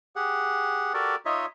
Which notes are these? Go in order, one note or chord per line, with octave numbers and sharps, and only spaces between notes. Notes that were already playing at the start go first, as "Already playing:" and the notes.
G4 G#4 F#5
F#4 G4 A4 A#4 D5
D#4 F4 C#5 D#5 E5